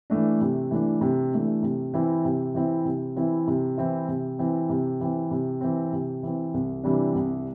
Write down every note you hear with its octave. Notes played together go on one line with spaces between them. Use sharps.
E3 A3 D4
C3
E3 A3 D4
C3
E3 A3 D4
C3
E3 C4 E4
C3
E3 C4 E4
C3
E3 C4 E4
C3
E3 C4 E4
C3
E3 C4
C3
E3 C4
C3
E3 C4
C3
E3 C4
C2
C3 E3 G3 D4
C2